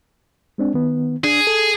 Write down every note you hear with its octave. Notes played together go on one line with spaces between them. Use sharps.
G#3 C4 D4
D#3 B3
D4 G#4
A4